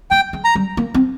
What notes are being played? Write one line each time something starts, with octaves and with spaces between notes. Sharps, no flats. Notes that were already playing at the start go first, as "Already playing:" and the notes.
A#3 G5
G#3
A#5
G3
A#3
C4